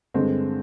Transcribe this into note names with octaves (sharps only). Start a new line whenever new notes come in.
G2 D3 G#3 C4